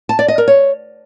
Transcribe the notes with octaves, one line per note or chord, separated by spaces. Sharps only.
A5
D5
D#5
A#4
C#5